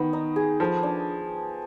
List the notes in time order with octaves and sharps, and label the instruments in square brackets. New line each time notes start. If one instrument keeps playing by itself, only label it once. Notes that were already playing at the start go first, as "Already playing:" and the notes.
Already playing: [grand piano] D#3 [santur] B3
[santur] D#4
G#4
[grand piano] F3 [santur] A4
[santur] D4